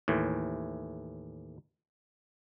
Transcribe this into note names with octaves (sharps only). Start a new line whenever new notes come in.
D#2 A2 E3